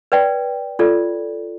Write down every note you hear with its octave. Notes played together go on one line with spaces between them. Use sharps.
B4 D5 G5
F4 A4 D5